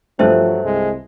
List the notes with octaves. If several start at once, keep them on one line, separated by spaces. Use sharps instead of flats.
G2 F3 F#3 A3 C5 E5 A5 F#6
C2 G#3